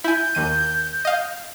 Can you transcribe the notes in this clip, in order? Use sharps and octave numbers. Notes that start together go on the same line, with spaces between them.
E4 G#5 G6
D#2 D#3 D#7
D#5 F5